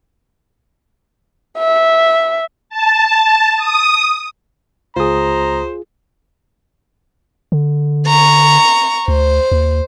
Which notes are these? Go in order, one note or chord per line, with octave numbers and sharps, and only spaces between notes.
E5
A5
D#6
C#2 F4 G#4 C5 A#5 D#6
D3
A#5 C#6
D2 C5
D#2